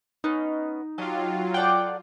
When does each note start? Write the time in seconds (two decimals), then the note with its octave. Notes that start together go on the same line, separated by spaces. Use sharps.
0.24 B3 C#4 D#4
0.98 F#3 F4 G4 D#5 A5
1.54 A4 D5 F#5 G5